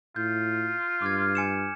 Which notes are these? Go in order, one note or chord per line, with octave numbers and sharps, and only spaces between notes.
A2 F4 G6
G2 D6 F6 G#6
G#5 C#7 E7